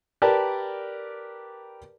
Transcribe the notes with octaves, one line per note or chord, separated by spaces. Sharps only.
G4 A#4 B4 D5 A5